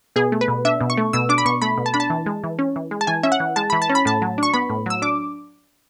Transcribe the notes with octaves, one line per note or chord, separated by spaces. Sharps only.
B2 G#4
A3
B4
B2
D4 E5
B2
C#6
A3
B2 E6
D4 D6
B5
B2 C#6
A3 B5
B2
A5
D4 B5
A5
E3
G#3
E3
C#4
E3
G#3
A5
E3 G#5
C#4 E5
F#5
E3
G#3 A5
E3 B5
A5
C#4
B5
A2 A5
F#3
D4 C#6
B3 B5
A2
F#3 E6
D4 D6